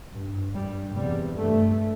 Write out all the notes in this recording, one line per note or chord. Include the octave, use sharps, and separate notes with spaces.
G2
G2 G3
E2 C3 G3
G2 A3